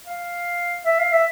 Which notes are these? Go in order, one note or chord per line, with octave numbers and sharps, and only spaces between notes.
F5
E5
F5
E5